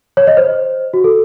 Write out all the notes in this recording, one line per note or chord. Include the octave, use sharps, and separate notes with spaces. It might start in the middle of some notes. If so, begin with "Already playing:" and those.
C#5
D#5
C5
F#4
A4